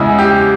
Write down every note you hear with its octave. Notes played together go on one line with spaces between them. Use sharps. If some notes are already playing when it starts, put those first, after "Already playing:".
Already playing: E2 C#3 G#3 E4
G4